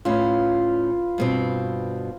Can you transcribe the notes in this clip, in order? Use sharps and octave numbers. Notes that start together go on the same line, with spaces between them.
A2 C#4 F4 B4
G2 B2 C4